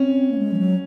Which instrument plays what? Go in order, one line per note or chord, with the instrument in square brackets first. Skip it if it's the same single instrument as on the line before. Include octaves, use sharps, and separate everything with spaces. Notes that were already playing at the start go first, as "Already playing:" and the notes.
Already playing: [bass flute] C4 [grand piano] C#4
[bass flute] A#3
G#3
F3
F#3